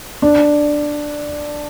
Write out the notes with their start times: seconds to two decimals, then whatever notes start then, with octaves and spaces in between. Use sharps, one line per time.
0.22 D4